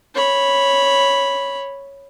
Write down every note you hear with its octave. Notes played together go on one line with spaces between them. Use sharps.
C#5 B5